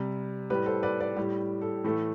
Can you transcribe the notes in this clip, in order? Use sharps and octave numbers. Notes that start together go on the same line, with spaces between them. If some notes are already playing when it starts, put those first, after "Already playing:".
Already playing: C3 G3
A2 G3 G4 B4
A4 C5
B4 D5
B4 D5
A2 G3 G4
A4
A2 E3 A3 A4